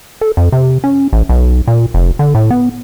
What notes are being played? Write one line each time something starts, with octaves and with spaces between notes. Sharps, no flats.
A4
F2
C3
C#4
A1
B1
A#2
F1
D3
A2
B3